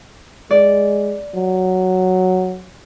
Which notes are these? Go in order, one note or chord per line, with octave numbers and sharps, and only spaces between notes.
G#3 D5
F#3